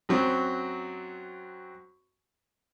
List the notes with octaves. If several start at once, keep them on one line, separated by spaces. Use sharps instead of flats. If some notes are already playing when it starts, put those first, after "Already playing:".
F#2 F#3 C4